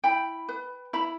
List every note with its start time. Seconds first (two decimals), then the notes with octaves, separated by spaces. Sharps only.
0.04 E4 G5 B5
0.49 B4
0.93 E4 B5